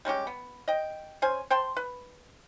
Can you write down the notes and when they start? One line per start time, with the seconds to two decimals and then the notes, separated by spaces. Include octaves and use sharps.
0.05 G3 G#3 C#4 G4
0.27 B3
0.68 D#5 G5
1.22 C#4 C5 G#5
1.50 C5 G5 A5 C6
1.77 B4